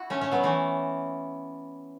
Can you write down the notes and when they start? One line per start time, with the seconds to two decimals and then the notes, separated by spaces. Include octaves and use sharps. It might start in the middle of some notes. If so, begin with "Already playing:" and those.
Already playing: E4 F#4
0.10 A3 C#4
0.21 A3 C#4
0.32 F#3 B3
0.43 E3 A3